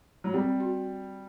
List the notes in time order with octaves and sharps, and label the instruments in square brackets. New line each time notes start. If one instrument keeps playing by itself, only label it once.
[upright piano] F#3
[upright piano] G3 [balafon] C4
[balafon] F#4